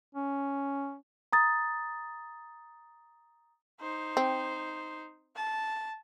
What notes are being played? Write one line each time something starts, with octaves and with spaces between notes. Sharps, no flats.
C#4
A#5 D#6 A6
D#4 C5
C4
A5